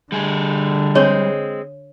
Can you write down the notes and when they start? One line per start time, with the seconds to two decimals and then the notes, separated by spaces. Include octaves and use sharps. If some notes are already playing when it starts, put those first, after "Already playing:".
0.12 D3 G3 G#4
0.95 G#3 C4 D4 C#5